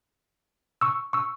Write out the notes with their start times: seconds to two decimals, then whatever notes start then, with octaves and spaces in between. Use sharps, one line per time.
0.81 C#6 E6
1.13 C#6 E6